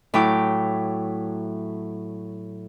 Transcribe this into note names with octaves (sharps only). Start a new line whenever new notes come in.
A2 F#3 E4 G5 D6